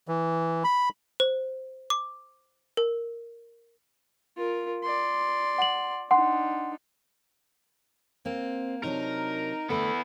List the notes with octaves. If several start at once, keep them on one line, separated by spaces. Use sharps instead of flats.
E3
B5
C5
D6
A#4
F4 A#4
D5 C6
F#5 F#7
D4 D#4 F#5 C6
A#3 C4
C3 F#3 D4 D#4 A#4
D3 A3 B3 E4 A4